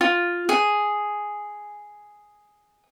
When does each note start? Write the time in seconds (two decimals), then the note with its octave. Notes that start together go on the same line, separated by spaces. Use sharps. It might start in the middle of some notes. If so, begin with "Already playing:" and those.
0.01 F4
0.49 G#4